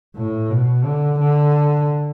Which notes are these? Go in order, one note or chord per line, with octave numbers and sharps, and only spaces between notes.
A2
B2
D3
D3